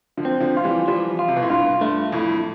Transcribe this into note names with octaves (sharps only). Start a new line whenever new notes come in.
D3 F3
C4
D3 F3
F4
E3 G3
E3 F3 G3
F4
C3
B2
A2
G2 F4
G2 A3
C2 F2 A2